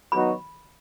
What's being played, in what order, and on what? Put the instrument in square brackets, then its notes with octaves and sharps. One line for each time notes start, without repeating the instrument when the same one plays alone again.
[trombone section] F#3 B3 D#4 F#4 [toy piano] B5